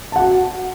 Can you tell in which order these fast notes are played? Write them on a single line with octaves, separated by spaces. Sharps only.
A5 F#5 F#4